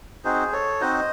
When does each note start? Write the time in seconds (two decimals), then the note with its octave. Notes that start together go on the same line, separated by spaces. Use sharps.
0.24 C4 D#4 F#4 G#4 C5
0.52 A4 C#5
0.80 C4 D#4 F#4 C5 D#5